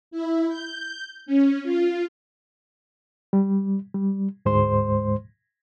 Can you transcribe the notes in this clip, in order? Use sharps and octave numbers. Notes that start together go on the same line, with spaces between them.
E4
G6
C#4
F4
G3
G3
D2 G#2 G#3 C5 C6